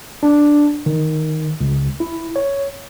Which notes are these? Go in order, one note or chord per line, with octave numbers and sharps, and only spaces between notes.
D4
D#3
C#2
E4
C#5